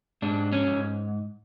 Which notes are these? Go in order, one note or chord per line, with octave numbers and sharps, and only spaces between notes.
G#2 D4
C#4
G#2